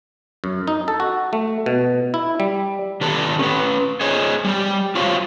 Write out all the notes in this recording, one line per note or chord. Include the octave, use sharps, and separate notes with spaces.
F#2
D#4
A4
F#4
A3
B2
E4
G3
D#3 G4 A4 B4 D5 A5
C#4 B4
G#4 C5 C#5 D#5
G3 G4
F4 F#4 C5 C#5 F5